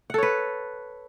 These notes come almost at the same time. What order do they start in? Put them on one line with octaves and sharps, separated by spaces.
F#5 A4 C#5 B4